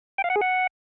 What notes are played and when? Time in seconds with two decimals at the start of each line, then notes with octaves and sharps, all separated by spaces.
0.18 G5
0.24 F5
0.30 F#5
0.36 G#4
0.41 F#5